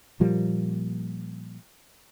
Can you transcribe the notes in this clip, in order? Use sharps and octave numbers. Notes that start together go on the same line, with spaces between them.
A#2 F3 G3 A#3